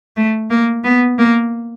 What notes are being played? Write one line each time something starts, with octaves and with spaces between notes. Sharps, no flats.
A3
A#3
B3
A#3